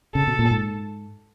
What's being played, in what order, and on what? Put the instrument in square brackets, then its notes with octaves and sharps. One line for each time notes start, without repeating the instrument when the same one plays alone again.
[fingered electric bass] C#3 [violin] A4
[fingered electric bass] B2
A#2
G#2